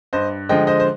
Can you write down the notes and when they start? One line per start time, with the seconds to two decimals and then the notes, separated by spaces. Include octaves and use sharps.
0.13 G2 C5 D#5
0.49 D3 F3 G#3 D#5 G5
0.67 C5 D#5
0.80 C5